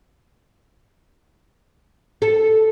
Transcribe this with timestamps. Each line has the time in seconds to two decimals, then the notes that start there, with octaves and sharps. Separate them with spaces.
2.22 A4